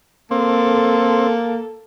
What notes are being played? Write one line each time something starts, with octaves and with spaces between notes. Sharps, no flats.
A#3 C4 A4